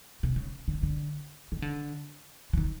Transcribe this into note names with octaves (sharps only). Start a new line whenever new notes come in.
C3
C#3
D3
D3
D#3
D3
E3
D#3